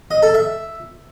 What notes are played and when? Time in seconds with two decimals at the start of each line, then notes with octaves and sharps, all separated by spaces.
0.11 D#5
0.22 A4
0.34 E5